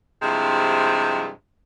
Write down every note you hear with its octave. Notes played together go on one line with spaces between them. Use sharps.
G2 C3 F3 G#3 E4